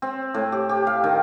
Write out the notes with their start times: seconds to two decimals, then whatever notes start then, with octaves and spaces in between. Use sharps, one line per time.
0.02 C4
0.34 A2
0.52 G4
0.69 G4
0.87 F5
1.04 D#3